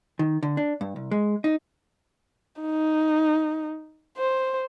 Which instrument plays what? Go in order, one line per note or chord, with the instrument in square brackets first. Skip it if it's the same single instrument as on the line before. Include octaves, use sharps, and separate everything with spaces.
[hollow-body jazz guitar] D#3
D3
D4
G2
C2
G#3
D#4
[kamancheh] D#4
C5